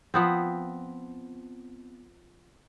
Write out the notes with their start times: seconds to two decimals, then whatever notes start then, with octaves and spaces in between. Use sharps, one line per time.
0.14 F3 B3 C4